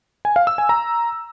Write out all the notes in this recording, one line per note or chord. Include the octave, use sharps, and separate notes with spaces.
G#5
F5
E6
G#5
A#5